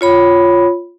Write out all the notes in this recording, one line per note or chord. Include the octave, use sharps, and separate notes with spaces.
F4 C#5 B5